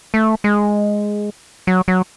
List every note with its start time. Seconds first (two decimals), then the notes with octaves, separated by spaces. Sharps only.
0.14 A3
0.44 G#3
1.67 F#3
1.88 F#3